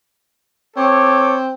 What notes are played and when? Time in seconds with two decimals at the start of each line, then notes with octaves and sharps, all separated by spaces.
0.77 C4 A4 C#5 D6